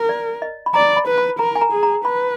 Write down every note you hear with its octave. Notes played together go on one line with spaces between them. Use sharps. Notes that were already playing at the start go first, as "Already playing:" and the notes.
Already playing: A#4
D5
D#5
B5
D5 A#5
B5
B4
B5
A#4 A#5
G#5
A#5
G#4
A#5
B4 B5